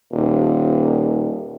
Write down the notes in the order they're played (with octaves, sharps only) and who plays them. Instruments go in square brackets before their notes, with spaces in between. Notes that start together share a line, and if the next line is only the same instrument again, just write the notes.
[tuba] D#1